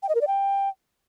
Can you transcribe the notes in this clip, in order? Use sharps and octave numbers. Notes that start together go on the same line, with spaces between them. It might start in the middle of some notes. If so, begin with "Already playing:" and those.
G5
D#5
A#4
D5
G5